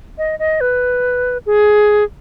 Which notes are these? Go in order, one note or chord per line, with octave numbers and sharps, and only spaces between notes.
D#5
D#5
B4
G#4